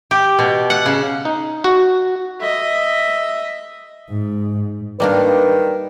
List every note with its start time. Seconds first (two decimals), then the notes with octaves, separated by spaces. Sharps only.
0.11 G4
0.39 B2
0.70 F#5
0.86 C#3
1.25 D#4
1.64 F#4
2.40 D#5 E5
4.10 G#2
5.00 D#3 G3 A#3 D4 B4